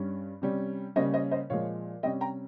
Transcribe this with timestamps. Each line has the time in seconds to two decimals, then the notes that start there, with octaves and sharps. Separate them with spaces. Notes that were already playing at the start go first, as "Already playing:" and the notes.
Already playing: G2 G3 C#4
0.42 C3 G3 C#4
0.96 C#3 G3 A#3 C#4 C5 D#5
1.13 C5 D#5
1.31 C5 D#5
1.50 A#2 F3 G#3 C#5 F5
2.03 C3 G3 C#4 D#5 G5
2.21 G5 A#5